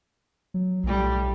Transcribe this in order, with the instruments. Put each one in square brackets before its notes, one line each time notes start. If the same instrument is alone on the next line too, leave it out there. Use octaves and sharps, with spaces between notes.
[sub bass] F#3
[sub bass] B1 [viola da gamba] A2 G3